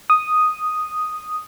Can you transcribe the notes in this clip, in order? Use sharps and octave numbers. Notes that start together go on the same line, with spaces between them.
D#6